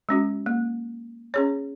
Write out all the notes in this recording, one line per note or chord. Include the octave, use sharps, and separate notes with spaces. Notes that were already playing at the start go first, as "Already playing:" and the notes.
G#3 C#4 F#4
A#3
C#4 G#4 C#5